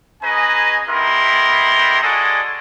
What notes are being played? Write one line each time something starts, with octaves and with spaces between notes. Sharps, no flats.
C#4 G#4 B4 D#5 G#5 A#5
B3 D#4 E4 G4 A#4 C6
G#3 F#4 A4 D5 D#5 G#5